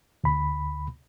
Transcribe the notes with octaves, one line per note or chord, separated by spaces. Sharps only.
D2 B5